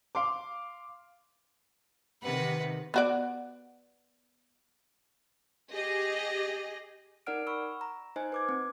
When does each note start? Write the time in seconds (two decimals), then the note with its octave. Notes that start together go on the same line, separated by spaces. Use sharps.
0.15 F5 C6 D6
2.22 C3 D#3 B4 F#5
2.94 B3 F#4 D5
5.72 G4 G#4 D#5
7.26 D#4 A#4 D5 F#5 F6 D7
7.47 B5 C#6 E6
7.81 A#5
8.16 D#4 C5 D#5 G#5
8.32 B4 D6 G#6
8.49 C4